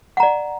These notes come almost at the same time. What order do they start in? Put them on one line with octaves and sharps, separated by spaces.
F#5 A#5 D5